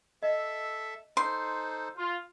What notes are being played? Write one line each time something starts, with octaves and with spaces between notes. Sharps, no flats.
A4 D#5 E5
D#4 A4 C5 C6
F4